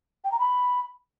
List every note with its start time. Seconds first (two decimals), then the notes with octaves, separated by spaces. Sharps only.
0.24 G5
0.32 A#5
0.39 B5